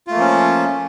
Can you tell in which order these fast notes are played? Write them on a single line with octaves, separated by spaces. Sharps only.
F4 A3 A#3 F3 C#4